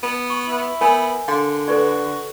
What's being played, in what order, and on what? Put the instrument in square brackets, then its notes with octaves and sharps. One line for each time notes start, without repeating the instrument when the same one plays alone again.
[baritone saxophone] B3
[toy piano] C#6
[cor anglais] E4
[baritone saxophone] B3 [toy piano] A#4 C#5 G#5
[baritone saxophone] D3 [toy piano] F5 C6
[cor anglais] F#4 [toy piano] A4 B4 D5